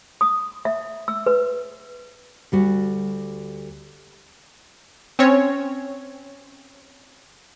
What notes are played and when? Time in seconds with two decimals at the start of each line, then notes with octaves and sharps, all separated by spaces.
0.21 D#6
0.65 E5
1.08 E6
1.26 B4
2.52 D2 G3 F#4
5.19 C4 C#4 C#5